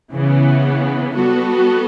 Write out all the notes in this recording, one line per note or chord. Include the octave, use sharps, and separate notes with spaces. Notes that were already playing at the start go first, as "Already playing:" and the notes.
C#3 E3 B3
G3 B3 F#4 A4